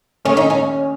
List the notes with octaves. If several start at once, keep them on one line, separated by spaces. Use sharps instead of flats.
D#2 C#3 A3 C#4
D#4
C#4